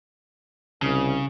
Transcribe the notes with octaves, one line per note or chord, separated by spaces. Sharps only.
C2 C#3